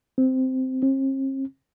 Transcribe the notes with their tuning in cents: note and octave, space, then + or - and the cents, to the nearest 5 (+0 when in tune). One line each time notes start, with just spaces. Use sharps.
C4 -10
C4 +45